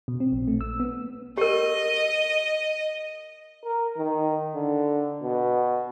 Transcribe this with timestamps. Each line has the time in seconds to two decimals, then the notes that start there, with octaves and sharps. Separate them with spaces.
0.08 B2
0.20 C4
0.32 A#1
0.48 A3
0.61 E6
0.80 B3
1.37 G4 A#4 D#5
3.65 A#4
3.97 D#3
4.55 D3
5.23 B2